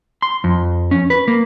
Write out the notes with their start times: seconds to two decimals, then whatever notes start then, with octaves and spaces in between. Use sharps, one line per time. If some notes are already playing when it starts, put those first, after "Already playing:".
0.22 C6
0.44 F2
0.91 C#4
1.10 B4
1.28 A#3